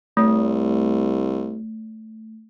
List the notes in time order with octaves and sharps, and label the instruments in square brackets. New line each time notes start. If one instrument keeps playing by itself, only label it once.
[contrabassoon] C2 [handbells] A3